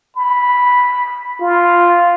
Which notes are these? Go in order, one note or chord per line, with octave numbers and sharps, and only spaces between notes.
B5
F4